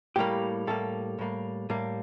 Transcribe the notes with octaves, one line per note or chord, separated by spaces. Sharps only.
A2 G3 A#3 G4
A2 G3 A#3 A4
A2 G3 A#3
A2 G3 A#3